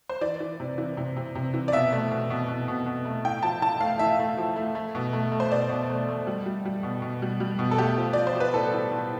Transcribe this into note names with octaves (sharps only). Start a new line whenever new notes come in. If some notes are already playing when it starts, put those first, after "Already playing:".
C5
E3 D5
E3
C3
E3
C3
C3
C3
E3
D5
B2 E5
A3
B2
B2
B2
B2
B2
A3
A2 G5
F3 A5
A2 A5
A3 F5
A2 E5
A3
F3
A3
A3
B2
A3
A3
C5
B2 D5
B2
A3
A3
G3
G3
G3
B2
B2
G3
G3
B2
A4
A3 G4
F3
F3 D5
C5
F3
B4
A2 A4
A2
A2